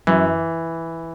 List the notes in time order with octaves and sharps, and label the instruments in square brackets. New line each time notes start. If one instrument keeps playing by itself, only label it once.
[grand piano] F#2 [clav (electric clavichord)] E3